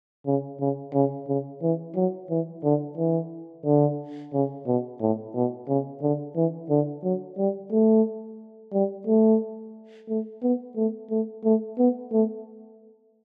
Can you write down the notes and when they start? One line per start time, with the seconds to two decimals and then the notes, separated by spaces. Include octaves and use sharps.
0.26 C#3
0.60 C#3
0.94 C#3
1.28 C#3
1.62 E3
1.96 F#3
2.30 E3
2.64 D3
2.98 E3
3.65 D3
4.33 C#3
4.67 B2
5.01 A2
5.35 B2
5.68 C#3
6.02 D3
6.36 E3
6.70 D3
7.04 F#3
7.38 G3
7.72 A3
8.73 G3
9.07 A3
10.09 A3
10.43 B3
10.76 A3
11.10 A3
11.44 A3
11.78 B3
12.12 A3